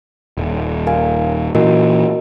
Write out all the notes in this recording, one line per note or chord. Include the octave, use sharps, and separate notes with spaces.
D#1
A#4 F5 G#5
A#2 E3 F#4 A#4 D#5